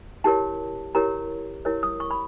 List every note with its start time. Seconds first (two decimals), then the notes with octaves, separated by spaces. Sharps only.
0.24 E4 G4 A#4 C#5 A5
0.95 E4 G4 A#4 C#5 A#5
1.65 E4 G4 A#4 C#5
1.83 D#6
2.00 C#6
2.11 B5